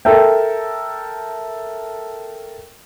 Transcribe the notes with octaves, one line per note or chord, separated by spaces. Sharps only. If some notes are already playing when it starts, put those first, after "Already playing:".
A4 A#4 E5 G5